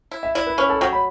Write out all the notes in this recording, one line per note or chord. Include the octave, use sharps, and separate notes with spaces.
E4
E5
E4 D5
B4
C#4 B4
A4
F#3 G5
B5